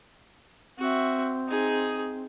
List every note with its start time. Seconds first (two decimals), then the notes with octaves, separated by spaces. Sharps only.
0.78 C4 F#4 E5
1.48 D#4 G#4